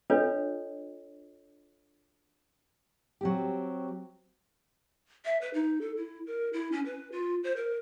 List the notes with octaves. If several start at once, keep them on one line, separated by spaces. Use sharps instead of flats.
D4 F4 A4 B4 C#5 D#5
F#3 C4 G4
E5
B4
D#4
A4
E4
A#4
E4
C#4
B4
F4
C5
A#4